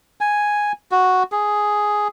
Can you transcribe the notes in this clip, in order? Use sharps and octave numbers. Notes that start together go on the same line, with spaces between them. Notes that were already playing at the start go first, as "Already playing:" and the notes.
G#5
F#4
G#4